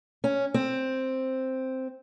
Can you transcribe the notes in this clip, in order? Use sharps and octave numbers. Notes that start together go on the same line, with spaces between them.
C#4
C4